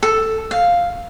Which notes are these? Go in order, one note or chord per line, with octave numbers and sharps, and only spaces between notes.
A4
F5